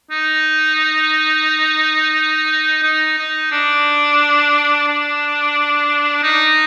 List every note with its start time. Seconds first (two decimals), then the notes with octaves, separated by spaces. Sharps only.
0.11 D#4
2.83 D#4
3.18 D#4
3.52 D4
4.88 D4
6.24 D#4